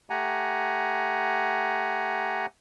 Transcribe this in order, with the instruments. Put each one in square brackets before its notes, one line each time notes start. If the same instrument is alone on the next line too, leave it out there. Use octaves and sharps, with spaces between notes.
[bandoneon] A3 G4 F#5 G#5 A#5